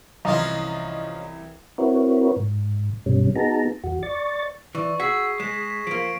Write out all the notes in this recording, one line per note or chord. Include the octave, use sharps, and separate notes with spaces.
C2 E3 F3 C#4 F4 D#5 A#5
C4 E4 F#4 A#4 B4 C#5
G#2
G2 B2 G3 C#4
B3 D#4 F#4 G#4 A5 A#5
E2 F#4
D5 C#6 A6
E3 D5 C#6
F#4 G#4 E6 G#6 B6 C7
G#3 A#6 B6 E7
F3 A#3 D7